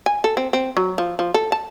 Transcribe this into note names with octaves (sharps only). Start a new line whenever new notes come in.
G#5
A4
C4
C4
F#3
F3
F3
A4
A5